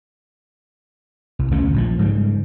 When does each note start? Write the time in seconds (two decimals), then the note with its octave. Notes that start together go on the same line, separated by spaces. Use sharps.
1.39 C2
1.51 G1 D2 A3 C#4
1.74 A#1 A#2 F3
1.99 G#2 C#3 G3